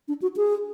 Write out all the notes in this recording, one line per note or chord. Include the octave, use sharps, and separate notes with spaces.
D4
F#4
G#4